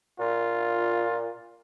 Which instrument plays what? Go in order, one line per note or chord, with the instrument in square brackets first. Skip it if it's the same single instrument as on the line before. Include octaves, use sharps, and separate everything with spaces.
[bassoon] A#2 [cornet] F4